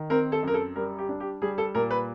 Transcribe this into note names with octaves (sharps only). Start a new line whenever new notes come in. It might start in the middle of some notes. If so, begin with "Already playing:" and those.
Already playing: D#3
C4 A#4
A4
F#2
A#4
A4
G3 A#4
G4
D4
G4
G3 G#4
A4
A#2 A#4
B4